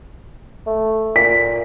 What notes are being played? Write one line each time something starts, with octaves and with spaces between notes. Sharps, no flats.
A3
A#2 B6